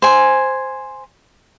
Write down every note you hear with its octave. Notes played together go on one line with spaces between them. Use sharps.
C5 G#5